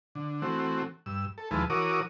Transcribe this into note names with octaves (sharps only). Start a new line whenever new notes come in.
D3
E3 A3 C4 F#4
G2 E6
A4
D#2 F3 G#3 E4 B4 A5
E3 F#4 A#4 C#5 D6 D#6